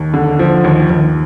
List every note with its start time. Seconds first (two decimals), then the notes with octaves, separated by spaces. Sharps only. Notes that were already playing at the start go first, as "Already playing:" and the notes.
Already playing: D#2
0.14 D3
0.39 F3
0.64 D#2
0.90 D#2